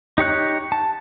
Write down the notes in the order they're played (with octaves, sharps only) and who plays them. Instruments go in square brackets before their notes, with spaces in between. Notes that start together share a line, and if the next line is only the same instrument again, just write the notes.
[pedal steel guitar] D#4 G4 C#5 F#6
A5